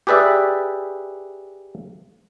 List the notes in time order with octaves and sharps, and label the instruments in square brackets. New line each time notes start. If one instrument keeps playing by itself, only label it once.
[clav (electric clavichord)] G4 G#4 B4 D5 E5